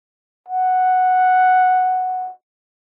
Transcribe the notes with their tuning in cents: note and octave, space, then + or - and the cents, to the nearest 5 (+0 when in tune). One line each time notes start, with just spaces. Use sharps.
F#5 +0